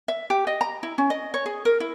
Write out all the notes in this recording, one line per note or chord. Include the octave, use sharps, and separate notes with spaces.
E5
G4
D#5
A#5
E4
C#4
D#5
C#5
G#4
A#4
E4